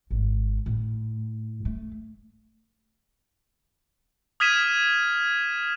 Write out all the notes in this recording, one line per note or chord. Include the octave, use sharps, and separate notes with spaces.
G#1
A2
A3
D#6 F6 G#6 B6 D#7 E7